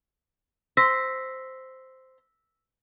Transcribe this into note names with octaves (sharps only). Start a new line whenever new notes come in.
C5 E6 A#6 B6